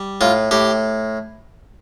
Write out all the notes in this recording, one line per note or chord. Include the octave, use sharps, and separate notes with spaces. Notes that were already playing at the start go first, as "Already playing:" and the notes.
Already playing: G3
A2 F4
A2 G4